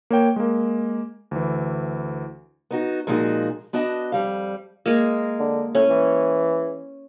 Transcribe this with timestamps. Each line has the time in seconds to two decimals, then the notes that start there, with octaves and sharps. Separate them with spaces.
0.10 A#3 C#5 G5
0.36 G#3 A#3
1.31 D2 E3
2.70 B3 D#4 F#4
3.07 A#2 F3 G#3 D#4 F#4 G#4
3.73 B3 D4 F#4 D#5 A5
4.12 F2 G3 F5
4.86 G#3 A#3
5.40 D3
5.75 A2 C#4
5.89 E3